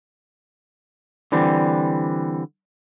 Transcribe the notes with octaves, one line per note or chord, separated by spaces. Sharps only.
D3 E3 G3 C4